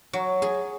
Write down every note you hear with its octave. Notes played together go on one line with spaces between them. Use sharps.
F#3
G#4